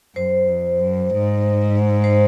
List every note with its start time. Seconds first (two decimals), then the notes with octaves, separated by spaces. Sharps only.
0.16 F#2 C5
0.48 F2
0.79 F#2
1.09 G#2
2.04 C5